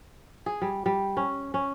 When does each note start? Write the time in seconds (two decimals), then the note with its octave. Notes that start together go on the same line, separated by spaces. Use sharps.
0.46 G#4
0.62 G3
0.86 G3
1.17 C#4
1.54 C#4